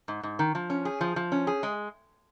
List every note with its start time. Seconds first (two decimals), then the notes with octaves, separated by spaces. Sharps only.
0.08 G#2
0.23 G#2
0.39 D#3
0.55 F3
0.70 C#4
0.85 G#4
1.01 F3
1.16 F3
1.32 C#4
1.47 G#4
1.63 G#3